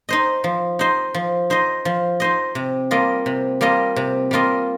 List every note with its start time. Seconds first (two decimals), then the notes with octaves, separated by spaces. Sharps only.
0.09 D#4 C5 D#5
0.44 F3
0.79 D#4 C5 D#5
1.14 F3
1.50 D#4 C5 D#5
1.85 F3
2.20 D#4 C5 D#5
2.55 C3
2.91 G3 A#3 F4 D#5
3.26 C3
3.61 G3 A#3 F4 D#5
3.96 C3
4.31 G3 A#3 F4 D#5